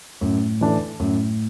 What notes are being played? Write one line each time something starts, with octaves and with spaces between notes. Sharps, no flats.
F#2 A2
E3 D4 A4
F#2 A2